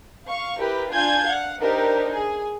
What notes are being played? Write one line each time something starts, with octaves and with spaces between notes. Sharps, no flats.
F5 C#6
E4 G4 A#4 B4
D4 F4 G#5 G6 G#6
F5 F#5
D4 D#4 G4 A#4 C5
G#4